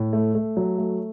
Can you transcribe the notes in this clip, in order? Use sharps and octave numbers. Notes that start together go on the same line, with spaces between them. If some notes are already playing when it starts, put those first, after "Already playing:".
Already playing: A2
A3
A3
F#3
A3